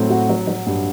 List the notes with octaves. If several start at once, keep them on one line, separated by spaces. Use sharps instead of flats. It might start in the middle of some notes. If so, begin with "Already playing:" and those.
Already playing: A2 F#3 C4
F#4
F#3
F#3
G2